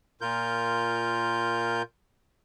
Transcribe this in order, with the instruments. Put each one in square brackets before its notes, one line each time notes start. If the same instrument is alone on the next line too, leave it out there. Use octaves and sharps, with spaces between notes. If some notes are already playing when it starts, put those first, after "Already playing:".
[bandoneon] A#2 F4 A#4 G6